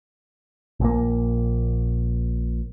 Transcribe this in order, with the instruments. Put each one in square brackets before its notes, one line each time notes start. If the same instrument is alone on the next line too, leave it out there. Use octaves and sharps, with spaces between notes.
[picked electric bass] A#1 A#2 A#3